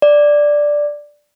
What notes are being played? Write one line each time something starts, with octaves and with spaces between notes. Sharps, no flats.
D5